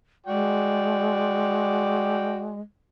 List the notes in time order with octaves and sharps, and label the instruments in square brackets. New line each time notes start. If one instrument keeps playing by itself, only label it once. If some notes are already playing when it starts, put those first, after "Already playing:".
[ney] G#3 [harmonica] F#4 D5 G5